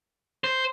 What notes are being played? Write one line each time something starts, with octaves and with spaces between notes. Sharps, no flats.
C5